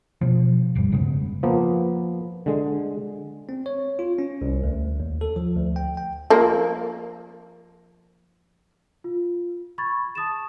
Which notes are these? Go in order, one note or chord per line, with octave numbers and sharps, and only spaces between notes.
B2 F3
D1 G1 G2 G3
F2 C#3 G#3 B3
F3 A#3 B3
D3 G#3
C4
C#5
F4
C#4
C2
D2
D#2
A4
F3
D2
G5
G5
F3 A#3
F4
B5 C#6 G#6 A6
A5 D#6 A6 E7